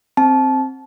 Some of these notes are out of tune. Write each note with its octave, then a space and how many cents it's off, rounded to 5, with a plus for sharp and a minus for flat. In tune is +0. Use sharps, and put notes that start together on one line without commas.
C4 +5 A5 -25